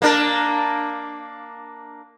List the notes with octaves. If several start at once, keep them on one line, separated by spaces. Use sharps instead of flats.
A#3 D4 A#4